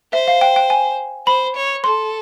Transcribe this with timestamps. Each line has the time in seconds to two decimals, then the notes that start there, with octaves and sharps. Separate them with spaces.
0.13 C5 E5
0.28 F5
0.41 G5
0.56 G5
0.70 G#5
1.27 C5 B5
1.56 C#5
1.84 A4 C6